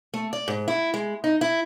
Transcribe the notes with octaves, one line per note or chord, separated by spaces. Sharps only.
A3
D5
G#2
E4
G#3
D#4
E4